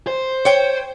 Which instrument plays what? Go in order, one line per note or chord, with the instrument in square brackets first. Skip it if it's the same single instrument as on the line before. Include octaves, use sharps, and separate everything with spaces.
[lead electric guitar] C5
[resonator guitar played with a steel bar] C#5 G5